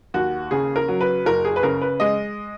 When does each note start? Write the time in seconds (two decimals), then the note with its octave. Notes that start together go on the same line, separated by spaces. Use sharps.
0.14 D#2 F#4
0.51 C#3 G#4
0.76 A#4
0.88 F#3
1.01 B4
1.26 F#1 A#4
1.45 G#4
1.56 B4
1.63 C#3 A#4
1.82 B4
2.00 G#3 D#5